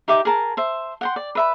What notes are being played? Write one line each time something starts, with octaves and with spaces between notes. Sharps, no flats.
D#4 G4 E5 D6
G#4 A#4 A5
C5 E5
F#5 G5 C6
D5
B4 E5 B5